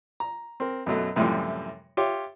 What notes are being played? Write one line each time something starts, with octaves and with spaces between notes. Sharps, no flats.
A#5
C4 A#4
F#2 B2 F#3 A3
F#2 A2 C3 E3 F3 G3
F4 G4 C#5 E5